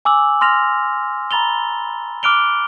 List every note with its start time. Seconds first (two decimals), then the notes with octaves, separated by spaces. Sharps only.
0.05 G#5 D6 E6 F#7
0.41 C6 F6 A#6 F7
1.31 A#5 B5 A6 F7 G7
2.23 D6 F6 F#6 D7 F7 G7